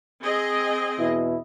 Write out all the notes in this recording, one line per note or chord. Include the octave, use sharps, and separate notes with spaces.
C4 G#4 D#5
E2 B2 E4